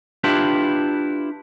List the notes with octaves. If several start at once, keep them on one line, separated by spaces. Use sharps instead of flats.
D4 E4 F4 G4 B4